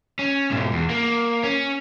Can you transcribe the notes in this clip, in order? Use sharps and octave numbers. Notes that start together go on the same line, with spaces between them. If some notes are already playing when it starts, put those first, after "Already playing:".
C#4
G#2 B2
E2
A#3
C#4